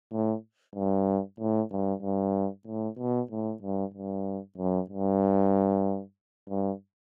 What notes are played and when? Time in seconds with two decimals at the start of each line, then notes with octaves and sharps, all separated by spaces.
0.12 A2
0.75 G2
1.39 A2
1.71 G2
2.03 G2
2.66 A2
2.99 B2
3.31 A2
3.62 G2
3.94 G2
4.58 F#2
4.90 G2
6.49 G2